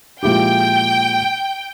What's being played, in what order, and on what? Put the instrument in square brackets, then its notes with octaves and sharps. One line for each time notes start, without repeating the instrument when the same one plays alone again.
[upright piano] A#2 F3 G#3 E4 G4 [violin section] G5